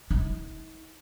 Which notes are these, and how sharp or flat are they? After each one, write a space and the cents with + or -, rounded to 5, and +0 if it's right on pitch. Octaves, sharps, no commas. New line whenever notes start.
D#4 +45